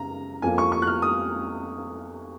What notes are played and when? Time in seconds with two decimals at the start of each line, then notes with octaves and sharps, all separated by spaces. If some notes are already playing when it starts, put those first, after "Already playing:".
Already playing: F#2 C#3 A#5
0.42 F2 F3 A#3 G#5
0.58 C#6
0.72 C#6
0.82 F#6
0.87 F6
1.02 D#6